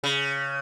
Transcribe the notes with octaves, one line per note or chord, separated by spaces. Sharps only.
C#3